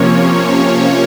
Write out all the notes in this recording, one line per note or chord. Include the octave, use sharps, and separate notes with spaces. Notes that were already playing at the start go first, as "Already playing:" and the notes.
Already playing: C3 F3 A#3 C#4 C#5
C#5